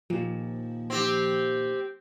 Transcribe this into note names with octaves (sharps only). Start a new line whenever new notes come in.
D#2 A#2 F3
C4 G4